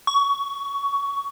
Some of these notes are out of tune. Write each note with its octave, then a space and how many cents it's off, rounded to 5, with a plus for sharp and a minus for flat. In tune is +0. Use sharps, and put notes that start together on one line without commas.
C#6 +20